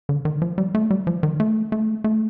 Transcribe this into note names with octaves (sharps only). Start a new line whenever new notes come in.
D3
D#3
F3
G3
A3
G3
F3
D#3
A3
A3
A3